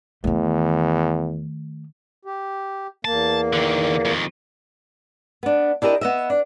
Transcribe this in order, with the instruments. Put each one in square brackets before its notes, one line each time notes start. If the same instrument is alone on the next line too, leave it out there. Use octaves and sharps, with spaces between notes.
[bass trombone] E2 [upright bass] D#3 A3
[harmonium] G4
[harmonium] E2 A#3 [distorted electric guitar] A5
[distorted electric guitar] D3 D#3
F2 D#3
[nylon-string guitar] B3 D4
D4 E4 G4 A#4 D#5
B3 D#5 E5
D4